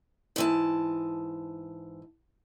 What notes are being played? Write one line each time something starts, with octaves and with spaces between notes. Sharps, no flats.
G#2 E3 A5